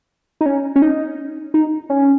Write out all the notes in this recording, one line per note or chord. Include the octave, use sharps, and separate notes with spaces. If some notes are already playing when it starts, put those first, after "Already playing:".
D#4
C#4
C#4
D#4
D#4
C#4